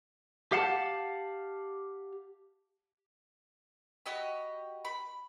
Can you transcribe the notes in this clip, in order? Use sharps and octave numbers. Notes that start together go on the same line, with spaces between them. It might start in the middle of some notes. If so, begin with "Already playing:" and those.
G4 F5 F#5 A5
F#4 G4 D#5 B5
B5